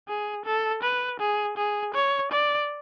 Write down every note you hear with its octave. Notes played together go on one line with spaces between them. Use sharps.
G#4
A4
B4
G#4
G#4
C#5
D5